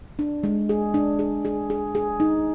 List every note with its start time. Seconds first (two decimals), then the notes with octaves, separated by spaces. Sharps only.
0.19 D4
0.44 G#3
0.69 G#4
0.94 D4
1.19 G#4
1.45 G#4
1.70 G#4
1.95 G#4
2.20 D#4